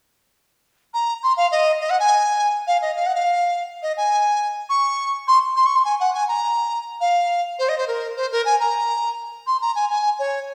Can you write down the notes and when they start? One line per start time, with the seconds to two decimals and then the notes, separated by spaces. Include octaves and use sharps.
0.94 A#5
1.23 C6
1.37 F5
1.51 D#5
1.80 D#5
1.90 F#5
2.00 G#5
2.67 F5
2.82 D#5
2.96 F5
3.06 F#5
3.15 F5
3.82 D#5
3.97 G#5
4.69 C#6
5.28 C6
5.56 C6
5.66 C#6
5.75 C6
5.85 G#5
6.00 F#5
6.14 G#5
6.28 A#5
7.00 F5
7.59 C5
7.69 D#5
7.78 C5
7.87 A#4
8.16 C5
8.31 A#4
8.45 G#5
8.60 A#5
9.47 C6
9.61 A#5
9.75 G#5
9.90 G#5
10.19 C#5